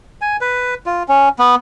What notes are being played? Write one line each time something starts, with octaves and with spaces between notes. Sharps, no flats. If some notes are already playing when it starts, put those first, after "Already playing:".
G#5
B4
F4
C#4
B3